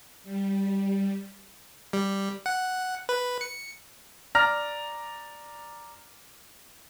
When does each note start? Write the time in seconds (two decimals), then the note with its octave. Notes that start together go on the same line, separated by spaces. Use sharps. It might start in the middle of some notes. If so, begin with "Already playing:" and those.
0.23 G3
1.93 G3
2.46 F#5
3.09 B4
3.41 C#7
4.35 D5 A#5 F6 A#6